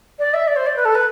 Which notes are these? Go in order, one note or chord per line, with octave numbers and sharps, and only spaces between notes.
D5
E5
D5
C5
D5
B4
A4
B4